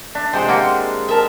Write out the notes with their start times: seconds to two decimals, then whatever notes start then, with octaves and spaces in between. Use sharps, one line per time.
0.15 D4 E5
0.33 C3 G#3 C4 G4 C5
0.48 A#3 E5 F#5 G5
1.09 G#4 A#4 E5 A5